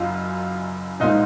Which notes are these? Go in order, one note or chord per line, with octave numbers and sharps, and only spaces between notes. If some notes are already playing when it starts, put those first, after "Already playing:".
Already playing: F#1 F#2 F4
C2 A#2 G#3 C4 D#4